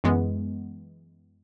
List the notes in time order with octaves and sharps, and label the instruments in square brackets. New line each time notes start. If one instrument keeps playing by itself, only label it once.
[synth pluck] F#2 E3 G#3 B3